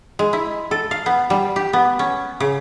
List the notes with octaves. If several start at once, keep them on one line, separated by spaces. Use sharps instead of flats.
G#3
E4
A4
F5
B3
G3
G4
B3
C#4
C#3